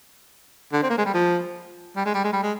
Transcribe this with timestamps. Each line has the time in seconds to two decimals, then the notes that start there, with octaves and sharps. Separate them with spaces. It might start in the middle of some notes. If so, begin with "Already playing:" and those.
0.72 D3
0.83 C4
0.90 A#3
0.98 G#3
1.05 G3
1.14 F3
1.96 G3
2.05 G#3
2.14 G3
2.24 G#3
2.33 G3
2.43 G#3